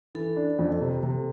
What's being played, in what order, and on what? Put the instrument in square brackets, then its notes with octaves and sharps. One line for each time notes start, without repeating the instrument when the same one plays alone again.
[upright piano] E3 [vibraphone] A4
[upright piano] D4
F2
C3
C3